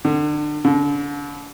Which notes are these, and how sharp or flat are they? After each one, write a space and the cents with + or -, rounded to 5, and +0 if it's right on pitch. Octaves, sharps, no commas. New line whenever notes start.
D3 +35
D3 -30